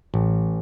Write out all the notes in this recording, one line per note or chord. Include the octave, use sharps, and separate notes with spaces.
A1